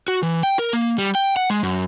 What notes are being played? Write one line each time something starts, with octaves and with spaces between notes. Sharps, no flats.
F#4
E3
G5
A#4
A#3
G3
G5
F#5
G#3
F#2